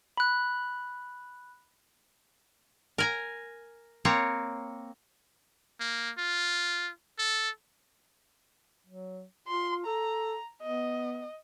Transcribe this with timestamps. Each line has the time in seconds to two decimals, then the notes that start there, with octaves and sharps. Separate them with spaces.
0.17 B5 F#6
2.98 A#4 G#5 A#5
4.05 A#3 C4 C#5 A#5
5.80 A#3
6.18 F4
7.18 A4
8.86 F#3
9.48 F4 C6
9.86 A4 A#5
10.63 B3 D#5